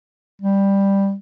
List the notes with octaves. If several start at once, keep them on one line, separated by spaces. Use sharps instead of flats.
G3